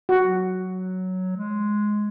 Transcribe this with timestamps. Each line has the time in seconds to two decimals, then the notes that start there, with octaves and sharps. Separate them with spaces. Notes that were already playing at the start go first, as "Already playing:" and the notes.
0.09 F#4
0.20 F#3
1.37 G#3